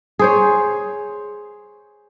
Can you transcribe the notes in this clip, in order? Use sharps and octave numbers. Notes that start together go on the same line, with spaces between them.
G#4 C5 C#5